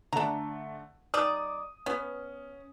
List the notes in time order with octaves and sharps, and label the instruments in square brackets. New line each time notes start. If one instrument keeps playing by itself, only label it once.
[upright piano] D3 A3 [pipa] D4 A#5
[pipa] G3 D#4 D5 [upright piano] D#6
[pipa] B3 [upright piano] C#4